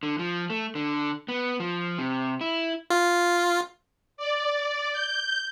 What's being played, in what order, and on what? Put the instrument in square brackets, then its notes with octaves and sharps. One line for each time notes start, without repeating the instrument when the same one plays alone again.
[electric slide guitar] D3
F3
A3
D3
B3
F3
C3
E4
[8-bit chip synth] F4
[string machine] D5
G6